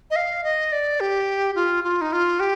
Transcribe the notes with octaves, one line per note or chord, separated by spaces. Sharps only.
D#5
F5
D#5
D5
G4
F4
F4
D#4
F4
G4